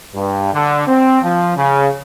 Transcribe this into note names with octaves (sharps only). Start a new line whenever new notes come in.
G2
D3
C4
F3
C#3